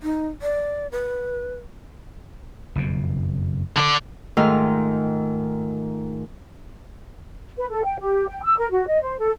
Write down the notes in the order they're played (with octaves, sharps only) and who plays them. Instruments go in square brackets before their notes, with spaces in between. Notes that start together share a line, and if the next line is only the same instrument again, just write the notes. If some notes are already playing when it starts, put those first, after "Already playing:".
[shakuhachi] D#4
D5
B4
[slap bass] F#1 F2 B2
[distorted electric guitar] D3 D5
[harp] G#2 D#3 A3 F4 F6
[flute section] B4
A4
G5
G4
G5
E6
A#4
F#4
D#5
C5
A4